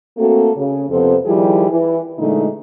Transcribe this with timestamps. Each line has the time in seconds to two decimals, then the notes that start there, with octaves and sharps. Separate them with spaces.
0.18 A3 A#3 C4 F#4 A4
0.56 C#3
0.90 F2 C3 F3 B3 A4 C5
1.26 D#3 F3 G3 E4 G4 G#4
1.70 E3
2.19 A#2 D3 E3 G#3 A3 D#4